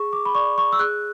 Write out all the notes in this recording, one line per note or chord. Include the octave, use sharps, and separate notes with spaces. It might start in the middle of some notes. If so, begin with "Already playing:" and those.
Already playing: G#4 C#6
D6
B5
D5 C#6
C#6
E6
G#4 F#6